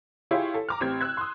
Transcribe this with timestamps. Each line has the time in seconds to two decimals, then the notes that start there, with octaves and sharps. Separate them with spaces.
0.31 E4 F4 G4 G#4 C#5
0.54 A4
0.69 A#5 D6 F6
0.80 A1 C4 G4 G#6
1.01 E6 F#6 G#6
1.17 C6 D#6